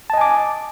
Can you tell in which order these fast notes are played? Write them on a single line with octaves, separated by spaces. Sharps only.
A5 D#5 G#5 D6